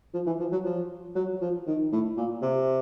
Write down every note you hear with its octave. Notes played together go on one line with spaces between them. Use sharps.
F3
E3
F3
F#3
F3
F#3
F3
D#3
A2
A#2
C3